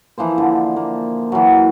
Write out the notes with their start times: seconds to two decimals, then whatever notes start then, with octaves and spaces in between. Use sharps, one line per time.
0.18 E3 F3 A#3 C5
0.38 D3
0.76 A#3
1.32 E3 F#3